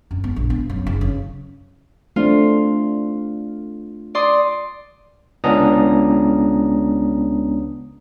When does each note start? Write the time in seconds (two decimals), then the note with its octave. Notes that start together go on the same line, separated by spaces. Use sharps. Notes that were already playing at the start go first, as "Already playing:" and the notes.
0.11 F#2
0.24 B3
0.36 A#1
0.50 B3
0.69 F#2
0.87 F#1
1.01 C#3
2.16 A3 C4 D4 F4
4.15 D5 C6 D#6
5.44 C#2 B3 C#4 D4 A#5 D#6